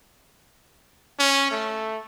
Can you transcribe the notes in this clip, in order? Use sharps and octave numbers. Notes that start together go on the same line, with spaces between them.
C#4
A3